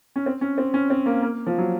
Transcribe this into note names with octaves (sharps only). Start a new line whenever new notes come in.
C#4
C4
C#4
C4
C#4
C4
A#3
A#3
F3
F#3